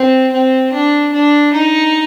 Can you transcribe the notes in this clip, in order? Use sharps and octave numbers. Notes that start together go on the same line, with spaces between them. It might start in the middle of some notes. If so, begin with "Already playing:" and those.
Already playing: C4
C4
D4
D4
D#4